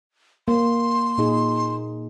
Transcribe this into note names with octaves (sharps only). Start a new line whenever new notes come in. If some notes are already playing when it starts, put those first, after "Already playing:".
A#3 C6
A#2 D#4 G#4